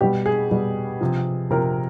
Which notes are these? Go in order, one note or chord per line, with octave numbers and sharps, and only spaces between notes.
B2 G3 G4
G#4
B2 G3
C3 F3
C3 F3 A#4